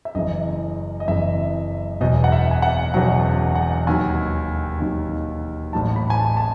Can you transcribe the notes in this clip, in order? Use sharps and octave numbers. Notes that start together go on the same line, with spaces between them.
E5
F#1 F#2 E3 D#5
D#5
F#1 F#2 E3 E5
E1 E2 B2 F#3 D#5
F#5
E5
G#5
F#5
E1 E2 B2 F#3 F#5
F#5
D#2 D#3 F#3 G#5
D#2 D#3 F#3
A1 A2 F#3 A5
B5
G#5
A5
A5